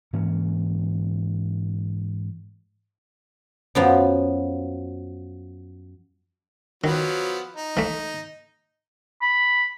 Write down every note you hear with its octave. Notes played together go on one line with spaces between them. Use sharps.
G#2 E3 A#3 C#4
F#2 F3 B3
D#3 F3 F#3 B3
D#4
E3 A3
B5